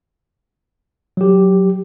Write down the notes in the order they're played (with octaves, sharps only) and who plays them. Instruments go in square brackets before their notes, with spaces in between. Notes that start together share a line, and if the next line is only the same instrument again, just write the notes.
[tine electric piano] F#3 G4